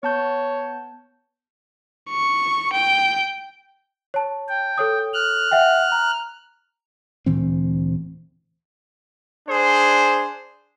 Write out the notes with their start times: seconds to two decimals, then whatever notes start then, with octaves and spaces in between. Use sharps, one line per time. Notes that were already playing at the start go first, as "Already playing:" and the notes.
0.03 B3 C#5 A5 G6
2.10 C#6
2.73 G5
4.14 C#5 A5
4.48 G5
4.78 A4 C#5 D#6
5.14 F6 F#6
5.51 E5 F#5 G5
5.92 A#5
7.26 D2 A#2 E3 C4
9.47 D4 G#4 C5